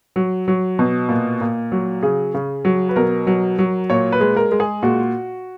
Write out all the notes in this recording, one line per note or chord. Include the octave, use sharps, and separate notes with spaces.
F#3
F#3
B2
A#2
A#2
F#3
C#3 G#4
C#3
F#3
B4
B2 A#4
F#3
F#3
A#2 C#5
B4
G#3
A#4
G#3
G#4
A#2 F#4